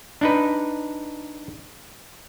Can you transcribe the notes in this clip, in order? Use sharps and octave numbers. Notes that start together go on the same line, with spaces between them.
D4 D#4 B4